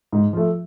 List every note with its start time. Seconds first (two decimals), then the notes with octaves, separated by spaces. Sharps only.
0.12 G#2
0.33 F3 A3